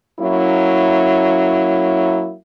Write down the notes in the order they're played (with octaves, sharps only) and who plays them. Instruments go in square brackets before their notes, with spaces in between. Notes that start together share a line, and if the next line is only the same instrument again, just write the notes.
[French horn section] F#3 A#3 C#4 E4